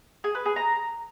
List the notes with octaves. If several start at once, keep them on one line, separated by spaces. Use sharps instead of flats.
G#4
B4
G#4
A#5